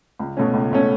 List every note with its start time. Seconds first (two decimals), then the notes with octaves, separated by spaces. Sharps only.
0.20 C#2
0.37 B2 A3 C#4
0.54 C#2
0.72 B2 A3 C#4